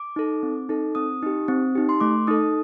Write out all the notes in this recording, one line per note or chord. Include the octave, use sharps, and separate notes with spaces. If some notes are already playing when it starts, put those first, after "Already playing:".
Already playing: D6
D#4 A4
C4
D#4 A4
C4 D#6
D#4 G4
C4
D#4 G4
C6
A3 D6
D#4 A4 D#6